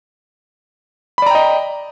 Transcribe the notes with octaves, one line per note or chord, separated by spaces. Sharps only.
D5 D#5 G5 A#5 B5